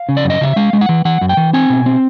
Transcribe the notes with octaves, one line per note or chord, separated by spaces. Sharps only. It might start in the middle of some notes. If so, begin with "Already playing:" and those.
Already playing: F5
C#3
D5
F#2
D#5
C#3 E5
G#3 F5
G#3
F#5
E3
E3 F#5
F#2
G5
E3
C4 G#5
B2
C4